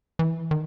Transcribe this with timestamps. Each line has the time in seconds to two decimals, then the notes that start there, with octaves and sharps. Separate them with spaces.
0.19 E3
0.51 D#3